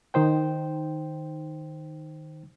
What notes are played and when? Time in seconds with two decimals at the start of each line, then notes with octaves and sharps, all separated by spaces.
0.14 D#3 D#4 C5 G5